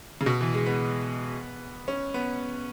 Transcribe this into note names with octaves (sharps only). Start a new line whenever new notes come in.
C#3
B2
E3
G#3
B3
C#4
B3